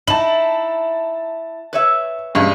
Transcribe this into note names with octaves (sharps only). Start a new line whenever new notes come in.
D#4 E4 A5 F#7
B4 C#5 E5
E2 G2 G#3 C#4